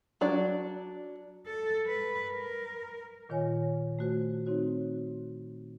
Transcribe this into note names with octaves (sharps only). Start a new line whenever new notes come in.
F#3 D4 D5
A4
B4
A#4
A#2 D#3 F4 C#5 G#5
A3 F#4 C5
C4 D#4 F#4 C#5